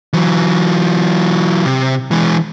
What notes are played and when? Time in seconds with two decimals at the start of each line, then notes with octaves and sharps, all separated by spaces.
0.13 E3 F#3
1.66 C3
2.11 E3 G#3